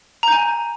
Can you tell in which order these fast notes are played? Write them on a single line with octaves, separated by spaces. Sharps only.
A#5 G6 G#5